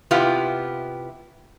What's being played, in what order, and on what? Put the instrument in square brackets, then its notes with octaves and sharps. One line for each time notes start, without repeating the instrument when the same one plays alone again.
[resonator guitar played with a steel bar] C3 B3 E4 F4 G4